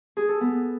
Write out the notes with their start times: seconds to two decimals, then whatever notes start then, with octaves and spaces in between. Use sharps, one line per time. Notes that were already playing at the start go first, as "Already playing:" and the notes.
0.17 G#4
0.29 A4
0.41 B3